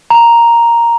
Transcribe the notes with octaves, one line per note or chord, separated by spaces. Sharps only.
A#5